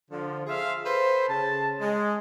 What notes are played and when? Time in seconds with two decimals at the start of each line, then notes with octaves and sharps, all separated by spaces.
0.10 D3 F3
0.47 F4 G#4 C5 E5 F5
0.85 A4 B4 C5
1.28 C#3 A5
1.80 G#3